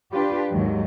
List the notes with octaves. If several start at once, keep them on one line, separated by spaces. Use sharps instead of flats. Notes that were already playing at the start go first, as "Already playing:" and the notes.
D4 F4 G4 B4
D#2 G#2 D#3 F#3